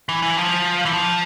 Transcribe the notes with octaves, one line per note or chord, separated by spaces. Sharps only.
E3
E3
F3
E3
F3